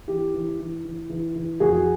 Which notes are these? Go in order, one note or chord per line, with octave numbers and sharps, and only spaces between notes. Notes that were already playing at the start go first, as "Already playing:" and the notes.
E3 G4
E3
E3
E3
E3
E3
F2 F#4 G#4